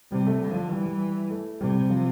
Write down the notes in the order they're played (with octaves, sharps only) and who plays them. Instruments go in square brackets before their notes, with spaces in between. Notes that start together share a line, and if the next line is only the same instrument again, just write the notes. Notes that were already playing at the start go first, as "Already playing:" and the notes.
[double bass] C3 [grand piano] G3
[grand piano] A3
[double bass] D3 [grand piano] G3
[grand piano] F3
[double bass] E3 [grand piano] G3
[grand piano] G3
A3
[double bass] C3 [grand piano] G3
[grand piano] F3